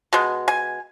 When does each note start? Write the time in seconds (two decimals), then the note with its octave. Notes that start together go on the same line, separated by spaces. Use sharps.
0.13 B2 G#3
0.48 G#5